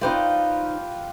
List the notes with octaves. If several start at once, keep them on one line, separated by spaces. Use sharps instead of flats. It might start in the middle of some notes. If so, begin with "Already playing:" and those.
D#4 F4 G4 B4 C5 D5